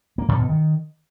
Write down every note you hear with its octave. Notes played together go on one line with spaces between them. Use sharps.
A#3
C3
B2
D#3